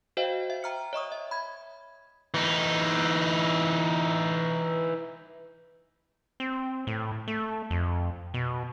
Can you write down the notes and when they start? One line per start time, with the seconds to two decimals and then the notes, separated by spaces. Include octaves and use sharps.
0.17 F#4 C5 D#5 F5 G5
0.50 E5
0.63 G5 A#5 F6 C#7
0.93 C#5 D#5 C#6 D#6
1.12 E5
1.31 B5 G#6
2.34 E3 D#4
6.40 C4
6.87 A2
7.28 A3
7.70 F2
8.34 B2